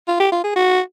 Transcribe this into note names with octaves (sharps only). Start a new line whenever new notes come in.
F4
G4
F4
G#4
F#4